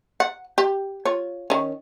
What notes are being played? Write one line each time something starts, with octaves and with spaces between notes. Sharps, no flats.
F#5
G4
F4 C#5
D#3 C#4